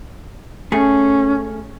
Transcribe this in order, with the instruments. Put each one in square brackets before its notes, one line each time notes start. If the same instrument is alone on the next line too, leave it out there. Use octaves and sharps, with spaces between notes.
[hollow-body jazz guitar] A3 G#4 [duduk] C#4